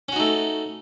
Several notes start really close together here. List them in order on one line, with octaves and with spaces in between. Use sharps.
C#4 F#4 D#4 A3